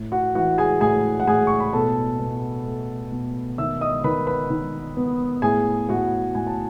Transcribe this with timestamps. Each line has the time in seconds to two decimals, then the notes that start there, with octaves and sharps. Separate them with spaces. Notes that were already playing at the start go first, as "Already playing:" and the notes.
Already playing: A2
0.12 F#4 F#5
0.35 E3 F#4 F#5
0.58 G#4 G#5
0.81 A2 G#4 G#5
1.20 F#5
1.27 A2 G#4 G#5
1.47 C#6
1.60 B5
1.73 B2 A4 A5
2.19 B2
2.66 A3
3.12 B2
3.58 D#3 E5 E6
3.81 D#5 D#6
4.04 D#3 B4 B5
4.27 B4 B5
4.50 D#3
4.97 B3
5.42 A2 G#4 G#5
5.89 A2 F#4 F#5
6.35 A2 G#5
6.47 A5